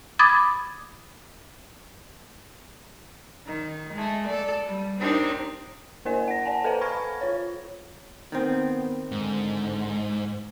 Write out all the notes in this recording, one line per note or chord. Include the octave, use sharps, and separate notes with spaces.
B5 D6 D#6 G#6 A6
D#3
G#3 A3
A4 D5
G3
C4 D4 D#4 G4 A#4
A#3 E4 A#4 C5 D#5 G#5
F#5 A#6
D5 F#5 G#5 A5
A4 B4 C5 F5 G5 A#5
B5 C#6 F6 G#6 A#6
F4 C#5
D#3 B3 C4
G#2 D3